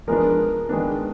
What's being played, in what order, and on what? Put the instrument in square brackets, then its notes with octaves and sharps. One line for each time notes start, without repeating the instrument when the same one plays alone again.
[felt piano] F3 G#3 B3 D4 [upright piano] A#4
[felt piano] D#3 G#3 B3 D4